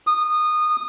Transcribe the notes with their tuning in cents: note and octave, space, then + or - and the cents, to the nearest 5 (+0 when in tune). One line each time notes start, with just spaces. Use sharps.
D#6 -20